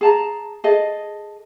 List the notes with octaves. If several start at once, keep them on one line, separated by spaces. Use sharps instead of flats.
G#4 A5 A#5
G#4 A4 D#5